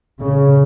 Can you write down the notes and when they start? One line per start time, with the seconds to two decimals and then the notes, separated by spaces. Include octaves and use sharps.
0.21 C#3